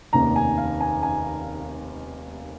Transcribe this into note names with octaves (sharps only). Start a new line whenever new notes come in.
F1 D#2 D#3 A#3 C#4 A#5
G#5
F5
G#5
G#5